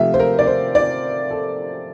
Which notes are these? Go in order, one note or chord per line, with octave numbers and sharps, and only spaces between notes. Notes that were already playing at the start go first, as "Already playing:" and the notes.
Already playing: C3 F3 A3 E5 F5
C5
A#4
D5
C5
D5
A4